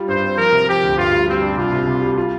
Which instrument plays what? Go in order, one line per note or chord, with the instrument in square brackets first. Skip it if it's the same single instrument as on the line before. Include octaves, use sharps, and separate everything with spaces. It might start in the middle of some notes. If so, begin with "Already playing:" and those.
Already playing: [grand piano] G3 F4
[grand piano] G2 [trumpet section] C5
[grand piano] C4
[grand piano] F3 [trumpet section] A#4
[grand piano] C3
[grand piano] F3 [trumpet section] G4
[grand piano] D2
[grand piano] G2 [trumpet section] F4
[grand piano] G3
[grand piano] G3 [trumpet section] C4
[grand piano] D4
[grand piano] C2 [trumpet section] F4
[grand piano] C3
C2
G3
F4